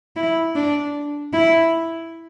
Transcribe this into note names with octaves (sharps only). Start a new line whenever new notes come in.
E4
D4
E4